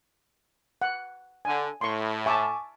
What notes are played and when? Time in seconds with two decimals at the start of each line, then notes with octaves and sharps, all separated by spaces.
0.82 F#5
1.45 D3 G#5
1.81 A2 C6 C#6
2.26 E5 G#5 A5 C#6 D6